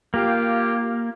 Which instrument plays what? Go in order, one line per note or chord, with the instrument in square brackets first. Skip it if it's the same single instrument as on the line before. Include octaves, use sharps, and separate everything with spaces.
[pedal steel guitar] A#3 [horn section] F4 G4